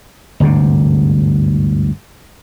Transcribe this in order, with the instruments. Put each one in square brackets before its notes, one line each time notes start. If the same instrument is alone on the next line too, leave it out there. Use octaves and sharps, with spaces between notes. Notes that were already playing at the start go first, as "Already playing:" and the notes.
[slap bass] G1 D2 G#2 C3